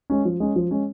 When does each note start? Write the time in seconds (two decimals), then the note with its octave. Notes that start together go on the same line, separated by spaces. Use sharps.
0.10 G#3 C#4
0.25 F3
0.40 G#3 C#4
0.56 F3
0.71 G#3 C#4